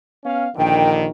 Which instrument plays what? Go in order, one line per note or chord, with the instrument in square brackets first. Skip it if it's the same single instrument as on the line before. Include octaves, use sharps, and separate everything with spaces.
[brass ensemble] B3 C#4 F5
[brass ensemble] A#1 D3 D#3 [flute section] G5